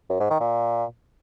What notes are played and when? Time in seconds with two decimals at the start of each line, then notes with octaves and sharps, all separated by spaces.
0.09 F#2
0.20 G#2
0.30 D#3
0.40 A#2